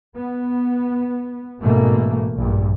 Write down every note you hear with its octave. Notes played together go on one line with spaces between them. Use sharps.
B3
A1 G#2 B2 A3 A#3
A#1 G2 A#2